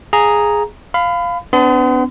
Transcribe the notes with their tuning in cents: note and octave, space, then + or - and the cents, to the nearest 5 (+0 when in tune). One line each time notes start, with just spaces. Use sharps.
G#4 +0 F5 +15 A#5 +0
F5 +0 B5 +30
B3 +35 D4 -20 C6 -40